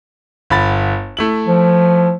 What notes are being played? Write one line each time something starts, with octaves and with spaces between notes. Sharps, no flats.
G1 B5 A6
A3 E4 F#7
F3